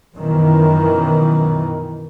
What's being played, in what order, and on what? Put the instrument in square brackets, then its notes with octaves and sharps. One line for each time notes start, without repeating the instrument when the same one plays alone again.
[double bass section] F#2 B2 D#3 E3